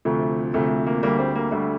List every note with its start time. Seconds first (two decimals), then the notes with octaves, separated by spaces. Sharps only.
0.05 D2 C3 F3 A3
0.54 D2 C3 F3 A3
0.70 A3
0.86 A#3
1.03 D2 D3 G3 A#3
1.19 C4
1.35 A#3
1.51 D2 D3 G3 A3